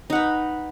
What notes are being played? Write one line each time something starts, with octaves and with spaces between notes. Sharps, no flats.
D#4 B4 F#5